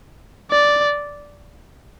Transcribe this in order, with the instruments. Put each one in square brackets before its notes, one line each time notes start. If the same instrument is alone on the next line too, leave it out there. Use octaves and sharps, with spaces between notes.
[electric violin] D5